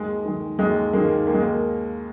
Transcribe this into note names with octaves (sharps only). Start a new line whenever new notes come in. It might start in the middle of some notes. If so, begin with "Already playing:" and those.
Already playing: D#2 G#3
D#3 G#3
D#2 G#3
D#3 G#3 A#3
D#2 A#3
G#3
A#3